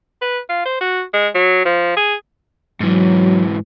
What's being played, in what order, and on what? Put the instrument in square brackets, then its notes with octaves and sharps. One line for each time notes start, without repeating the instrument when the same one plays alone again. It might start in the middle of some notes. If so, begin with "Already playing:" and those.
[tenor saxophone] B4
F4
C5
F#4
G#3
F#3
F3
G#4
[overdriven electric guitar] G#2 E3 [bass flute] F#3